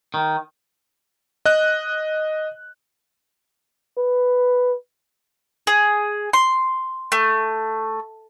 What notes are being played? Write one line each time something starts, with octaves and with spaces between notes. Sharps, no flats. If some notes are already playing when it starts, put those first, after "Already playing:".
D#3
D#5 F#6
B4
G#4
C6
A3